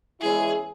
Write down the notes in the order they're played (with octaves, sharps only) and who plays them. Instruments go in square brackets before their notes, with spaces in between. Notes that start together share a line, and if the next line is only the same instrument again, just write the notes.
[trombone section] E2 E3 G#3 C#4 E4 [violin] G#4